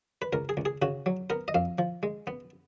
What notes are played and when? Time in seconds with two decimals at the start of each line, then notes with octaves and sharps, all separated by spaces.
0.22 B4
0.33 C#2 A#4
0.49 G#4
0.57 C#2
0.65 G#4
0.82 C#3 F#4
1.06 F#3
1.30 B3 A#4
1.48 D#5
1.54 F2 F5
1.78 F3
2.03 G#3
2.27 B3